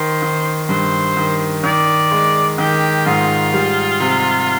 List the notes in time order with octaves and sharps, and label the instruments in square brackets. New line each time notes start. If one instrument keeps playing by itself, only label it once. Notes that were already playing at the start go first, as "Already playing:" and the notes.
Already playing: [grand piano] D#3 [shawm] C5
[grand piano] D#3
[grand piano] G2 [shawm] C5
[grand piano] D#3
[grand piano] D#3 [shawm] D5
[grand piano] G#3
[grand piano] D#3 [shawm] G4
[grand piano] G#2 [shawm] F4
[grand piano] G3
C3